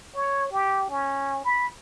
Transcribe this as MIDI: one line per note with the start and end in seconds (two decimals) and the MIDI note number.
0.15 0.49 73
0.51 0.86 67
0.90 1.40 61
1.44 1.67 83